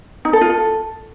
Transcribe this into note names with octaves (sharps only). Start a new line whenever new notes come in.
D#4
A4
F4
A4